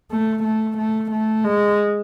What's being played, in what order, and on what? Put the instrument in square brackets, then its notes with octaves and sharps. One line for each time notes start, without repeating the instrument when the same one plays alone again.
[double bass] A3
A3
A3
A3
G#3